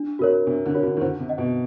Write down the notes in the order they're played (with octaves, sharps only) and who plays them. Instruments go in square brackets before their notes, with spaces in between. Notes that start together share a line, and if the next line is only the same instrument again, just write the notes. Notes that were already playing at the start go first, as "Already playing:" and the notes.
Already playing: [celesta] D4
[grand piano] C3 [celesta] F#4 A#4 C#5
[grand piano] C3 [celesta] D4
[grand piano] D3
[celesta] F#4 A#4 C#5
[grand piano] D3
D#3
[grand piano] D3 [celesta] C5
[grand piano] C3
[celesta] D#5 F#5
[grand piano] B2